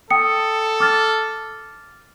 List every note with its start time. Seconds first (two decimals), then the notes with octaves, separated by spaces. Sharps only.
0.11 A4 G5 D#6 C#7
0.80 D6 F6 A6